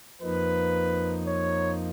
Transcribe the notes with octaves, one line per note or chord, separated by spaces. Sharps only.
F2 F3 A#3 D#4 B4
C#5